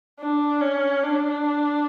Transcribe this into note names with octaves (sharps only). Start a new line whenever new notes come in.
D4
C#4
D4